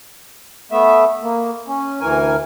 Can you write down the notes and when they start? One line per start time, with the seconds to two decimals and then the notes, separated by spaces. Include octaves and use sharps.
0.72 A3 B3 E5
1.22 A#3
1.68 C#4
2.01 D2 E3 A#4 G#5